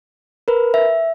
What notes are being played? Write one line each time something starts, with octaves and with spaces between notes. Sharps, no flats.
A#4 B4
E5